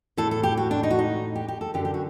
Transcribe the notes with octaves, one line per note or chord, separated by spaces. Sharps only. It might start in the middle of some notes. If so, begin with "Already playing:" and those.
A2 A4
A4
G4
F#4
D4
D#4
F#4
D#4
G4
G4
A4
F#2 D3 G4
G4
F#4